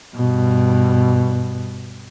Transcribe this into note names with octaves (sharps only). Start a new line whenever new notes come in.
G2 B2